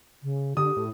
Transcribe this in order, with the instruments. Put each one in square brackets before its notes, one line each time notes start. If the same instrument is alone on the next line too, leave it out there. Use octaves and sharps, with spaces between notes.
[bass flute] C#3
[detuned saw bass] D3 [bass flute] G4 [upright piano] D#6
[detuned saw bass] A2